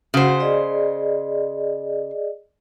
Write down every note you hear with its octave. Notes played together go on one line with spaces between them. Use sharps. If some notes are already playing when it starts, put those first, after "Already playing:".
C#3 F#4 C5 F#5
G#4 D5 D#5